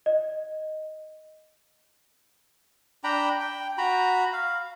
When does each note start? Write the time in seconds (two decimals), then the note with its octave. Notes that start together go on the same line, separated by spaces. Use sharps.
0.06 D#5
3.04 D4 G5 A#5 B5
3.40 G5
3.78 F#4 A#5 B5
4.33 F5